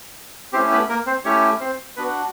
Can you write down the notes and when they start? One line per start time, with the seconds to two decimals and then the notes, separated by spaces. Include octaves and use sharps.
0.53 A3 C4 C#4 E4 G4 C5
0.71 B3 B4
0.89 A#3 A#4
1.07 C4 C5
1.25 A3 C#4 E4 G4 C#5
1.60 C4 C5
1.96 B3 D4 F#4 B4